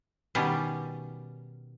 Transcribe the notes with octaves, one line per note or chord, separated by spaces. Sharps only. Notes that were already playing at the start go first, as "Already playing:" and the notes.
B2 D#3 G3 C#4 G4